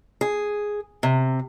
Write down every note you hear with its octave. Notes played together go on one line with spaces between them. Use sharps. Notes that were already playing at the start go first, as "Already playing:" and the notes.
G#4
C3